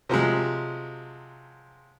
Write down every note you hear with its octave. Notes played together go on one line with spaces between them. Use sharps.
C3 F3 F#3 G#3